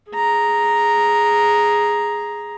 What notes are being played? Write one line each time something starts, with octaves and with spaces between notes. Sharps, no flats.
G#4 A#5